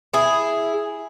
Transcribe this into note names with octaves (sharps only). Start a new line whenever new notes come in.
E4 G#4